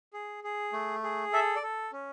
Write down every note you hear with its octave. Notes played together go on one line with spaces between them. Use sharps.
G#4
G#4
A3
G#4
A4 E5
D5
A4
C#4